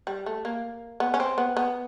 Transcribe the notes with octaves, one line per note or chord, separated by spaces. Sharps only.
G3
A3
A#3
B3
C#4
C4
B3
B3